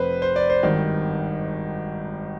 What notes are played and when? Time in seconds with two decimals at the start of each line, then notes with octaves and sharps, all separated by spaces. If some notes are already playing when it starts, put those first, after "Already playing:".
Already playing: F1 F2 C3 B4 C5
0.22 C5
0.36 D5
0.50 C5
0.63 G#1 G2 D#3